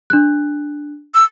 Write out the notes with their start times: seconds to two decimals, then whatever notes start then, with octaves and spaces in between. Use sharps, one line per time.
0.10 D4 F#6
1.14 E6